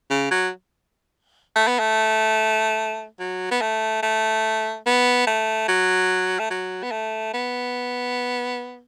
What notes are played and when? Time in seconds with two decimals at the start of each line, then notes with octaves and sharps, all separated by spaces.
0.10 C#3
0.31 F#3
1.56 A3
1.68 B3
1.79 A3
3.20 F#3
3.51 B3
3.61 A3
4.03 A3
4.86 B3
5.27 A3
5.68 F#3
6.39 A3
6.51 F#3
6.83 B3
6.92 A3
7.34 B3